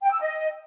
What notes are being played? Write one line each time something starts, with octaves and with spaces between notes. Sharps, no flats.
G5
E6
D#5